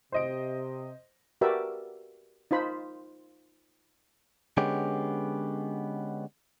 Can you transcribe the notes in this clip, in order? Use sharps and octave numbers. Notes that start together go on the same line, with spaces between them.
C3 C5 D#5 D7
F#4 G4 A#4 B4 D5 E5
D#4 F4 C5 B5
D3 G#3 B3 C#4 G4